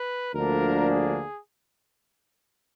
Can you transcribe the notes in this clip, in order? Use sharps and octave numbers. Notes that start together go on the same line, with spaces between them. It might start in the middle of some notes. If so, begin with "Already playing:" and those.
Already playing: B4
D2 D3 F3 A#3 D4 A#4
G#4